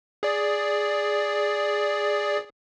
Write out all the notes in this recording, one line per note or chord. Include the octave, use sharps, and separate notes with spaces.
G#4 D5